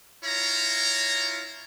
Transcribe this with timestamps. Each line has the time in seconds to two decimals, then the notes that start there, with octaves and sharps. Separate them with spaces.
0.24 E4 F4 C#5 A#5